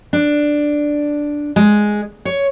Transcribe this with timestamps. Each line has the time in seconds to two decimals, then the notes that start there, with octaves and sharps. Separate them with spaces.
0.13 D4
1.56 G#3
2.25 C#5